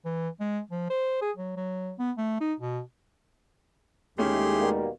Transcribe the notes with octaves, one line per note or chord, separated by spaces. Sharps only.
E3
G#3
F3
C5
G#4
F#3
F#3
B3
A3
D#4
B2
D#2 G#3 A3 C#4 E4 G4 G#4 C6
B2 G3 A#3